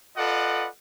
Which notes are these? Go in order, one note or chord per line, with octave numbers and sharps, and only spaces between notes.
F4 A4 B4 D5 D#5 F#5